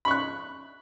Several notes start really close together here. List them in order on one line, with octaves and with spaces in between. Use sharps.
B5 C#6 F#6